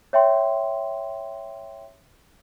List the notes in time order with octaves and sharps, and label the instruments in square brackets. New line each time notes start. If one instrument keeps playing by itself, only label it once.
[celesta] C#5 E5 G5 C6